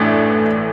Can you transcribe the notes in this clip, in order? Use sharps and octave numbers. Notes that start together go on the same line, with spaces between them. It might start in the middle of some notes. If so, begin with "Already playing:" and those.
Already playing: A1 A2 E3 A3 D4